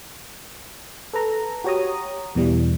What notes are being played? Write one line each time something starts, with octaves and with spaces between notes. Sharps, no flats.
A4 B4 A#5
F#4 G4 C#5 A#5 D#6
E2 B2 E3 G3